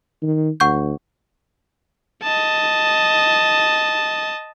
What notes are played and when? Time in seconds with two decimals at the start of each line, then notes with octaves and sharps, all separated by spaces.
0.22 D#3
0.60 D2 F#5 C#6 G6
2.23 D#5 A5